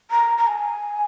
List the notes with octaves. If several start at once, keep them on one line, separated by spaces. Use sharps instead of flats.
A#5
A#5
G#5